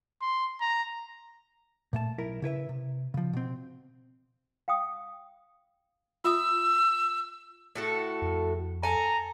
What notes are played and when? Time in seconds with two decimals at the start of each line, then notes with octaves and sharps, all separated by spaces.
0.21 C6
0.61 A#5
1.93 A#2 A3 A5
2.18 B1 E4 A#4
2.42 C#3 E4 B4 E5
2.69 C3
3.14 C#3 F3
3.33 B2 C4
4.68 F5 G5 D#6
6.24 F4 E5 D#6 E6
7.75 A2 F#4 A4
8.22 F2
8.83 A4 G#5 A#5